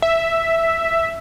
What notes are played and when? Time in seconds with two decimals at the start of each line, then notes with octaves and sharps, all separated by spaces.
0.02 E5